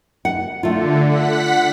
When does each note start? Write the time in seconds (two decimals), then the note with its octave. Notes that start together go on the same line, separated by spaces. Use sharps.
0.25 F#5
0.63 D3 A3 F4
1.07 F#5 B6